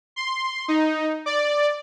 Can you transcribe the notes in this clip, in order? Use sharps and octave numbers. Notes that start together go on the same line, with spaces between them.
C6
D#4
D5